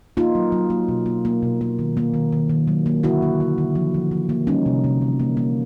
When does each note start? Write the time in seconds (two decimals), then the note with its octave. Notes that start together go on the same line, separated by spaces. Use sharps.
0.17 A#3 D#4 F4
0.35 F#3
0.52 F#3
0.70 A#3
0.88 B2
1.06 A#3
1.25 A#3
1.43 B2
1.61 A#3
1.79 D#3
1.97 A#3
2.14 D#3
2.32 D#3
2.50 D#3
2.68 F#3
2.86 A#3
3.03 D3 E4 F#4
3.22 A#3
3.40 D3
3.58 D3
3.75 F3
3.94 F3
4.11 F3
4.29 A#3
4.47 G3 C#4 D#4
4.66 C3
4.84 C3
5.02 E3
5.20 A#3
5.37 A#3